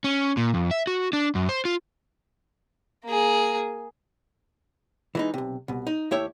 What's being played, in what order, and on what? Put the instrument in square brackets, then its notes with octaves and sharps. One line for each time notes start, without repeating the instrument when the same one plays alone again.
[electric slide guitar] C#4
A#2
F2
E5
F#4
D4
F#2
C5
F4
[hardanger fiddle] A#3 G#4
[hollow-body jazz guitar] E3 G#3 D#4
B1 C3
C2 B2
D#4
D#2 A3 E4 G4 C#5 E5